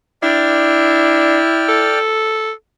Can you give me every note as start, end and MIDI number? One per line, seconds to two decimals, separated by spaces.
0.23 1.39 62
0.23 1.97 64
0.23 1.98 74
0.23 1.98 79
0.23 1.98 89
1.69 2.51 69